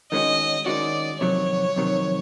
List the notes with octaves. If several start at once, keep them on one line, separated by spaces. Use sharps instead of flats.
D#3 G#3 C#4 F#4 D#5
D#3 G#3 C#4 F#4 D5
F2 C3 D#3 F#3 C#5
F2 C3 D#3 F#3